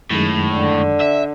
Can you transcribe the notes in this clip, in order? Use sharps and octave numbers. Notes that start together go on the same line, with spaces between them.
F#2 A2 D#3 G#3
D3
E5